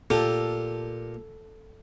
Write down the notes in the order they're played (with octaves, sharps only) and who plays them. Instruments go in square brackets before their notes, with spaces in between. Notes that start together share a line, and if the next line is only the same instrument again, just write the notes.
[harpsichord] A#2 G4 A#4 [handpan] A4